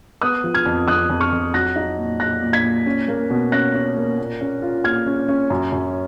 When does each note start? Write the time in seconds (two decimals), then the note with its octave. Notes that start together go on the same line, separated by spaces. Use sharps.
0.22 B3 D#6 F#6
0.44 F3
0.54 F6 G#6
0.66 F2
0.88 F2 D#6 F#6
1.10 F2
1.20 C#6 F6
1.32 F2
1.54 F#3 F#6 A#6
1.76 D#4
1.98 A#2
2.19 A#2 F#6 A#6
2.42 A#2
2.53 G#6 B6
2.63 A#2
2.86 C#4
3.08 A#3
3.30 B2
3.52 C#4 F#6 A#6
3.74 C#4
3.97 A#3
4.19 A#2
4.41 C#4
4.62 F4
4.84 A#2 F6 G#6
5.06 C#4
5.28 C#4
5.50 F#2
5.72 F#2